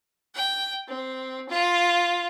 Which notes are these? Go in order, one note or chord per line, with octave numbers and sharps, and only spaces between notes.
G5
C4
F4